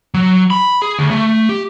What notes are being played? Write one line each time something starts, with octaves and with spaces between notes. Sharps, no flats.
F#3
B5
G#4
D2
A3
G4